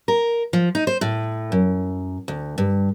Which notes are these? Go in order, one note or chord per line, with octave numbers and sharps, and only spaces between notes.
A#4
F3
D#4
C5
A2
F#2
D2
G2